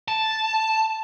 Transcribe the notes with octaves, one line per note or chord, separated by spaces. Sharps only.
A5